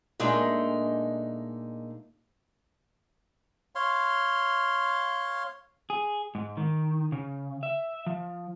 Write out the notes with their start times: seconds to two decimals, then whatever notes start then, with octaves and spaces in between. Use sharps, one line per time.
0.20 A#2 G#3 A3 D4 D#4
3.75 C#5 F5 C6
5.90 G#4
6.35 G#2
6.57 D#3
7.12 C#3
7.63 E5
8.07 F3